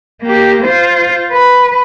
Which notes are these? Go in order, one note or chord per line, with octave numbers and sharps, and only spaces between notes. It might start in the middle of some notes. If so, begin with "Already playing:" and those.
A#3 G4
F4 C5
B4